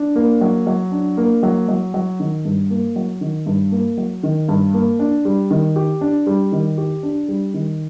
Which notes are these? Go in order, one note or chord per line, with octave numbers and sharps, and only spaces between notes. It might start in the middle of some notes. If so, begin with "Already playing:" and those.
Already playing: D4
A#3
F#3
F#3
D4
A#3
F#3
F#3
F#3
D#3
G2
A#3
F#3
D#3
G2
A#3
F#3
D#3
G2
A#3
D4
G3
D#3
G4
D4
G3
D#3
G4
D4
G3
D#3